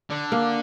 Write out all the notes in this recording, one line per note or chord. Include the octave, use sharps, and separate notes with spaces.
D3
A#3